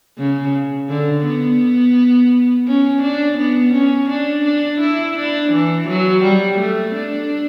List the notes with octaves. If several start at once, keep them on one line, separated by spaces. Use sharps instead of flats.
C#3
D3
B3
C#4
D4
B3
C#4
D4
D4
E4
D4
E3
F#3
G3
A3
D4